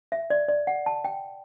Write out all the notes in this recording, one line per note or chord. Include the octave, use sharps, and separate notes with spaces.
E5
D5
D5
F#5
A5
G5